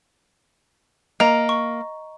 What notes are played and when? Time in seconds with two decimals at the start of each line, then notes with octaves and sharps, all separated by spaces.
1.20 A#3 D#5 A#5
1.49 C#6